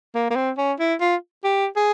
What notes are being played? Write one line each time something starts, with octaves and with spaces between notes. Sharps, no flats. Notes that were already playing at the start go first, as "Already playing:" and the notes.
A#3
A#3
C4
C#4
E4
F4
G4
G#4